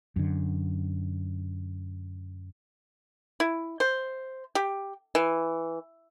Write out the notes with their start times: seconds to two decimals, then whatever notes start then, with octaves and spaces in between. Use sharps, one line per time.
0.16 F#2 D3
3.40 E4
3.80 C5
4.55 G4
5.15 E3